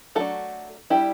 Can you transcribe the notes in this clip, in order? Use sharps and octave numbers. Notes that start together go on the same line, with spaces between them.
F#3 A3 D4 F#4 A4
G3 D4 E4 G4